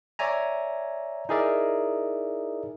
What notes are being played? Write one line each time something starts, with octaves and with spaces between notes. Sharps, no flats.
C#5 D5 E5 G#5 A#5
D#4 E4 G#4 A#4 D5 E5